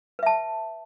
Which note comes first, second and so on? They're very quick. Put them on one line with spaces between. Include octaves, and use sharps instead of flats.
B4 E5 A5